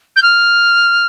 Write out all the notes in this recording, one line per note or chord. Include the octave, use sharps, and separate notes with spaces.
G6
F6